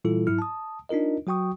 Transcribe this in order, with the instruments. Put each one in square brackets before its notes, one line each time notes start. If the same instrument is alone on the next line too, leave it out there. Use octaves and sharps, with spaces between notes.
[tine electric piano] A#2 E3 G3 E4 F4 A4
G#2 F#3 E4 F6
A5 D#6
D4 D#4 F4 A#4 D#5
F#3 F#4 G5 C#6 D#6